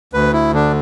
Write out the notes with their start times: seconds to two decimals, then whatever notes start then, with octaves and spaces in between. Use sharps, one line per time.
0.13 D2 B4
0.33 E4
0.54 D3 D4